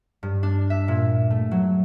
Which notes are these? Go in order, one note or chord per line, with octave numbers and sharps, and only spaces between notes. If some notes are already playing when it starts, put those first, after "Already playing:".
G2
D4
E5
A#2
A3
F#3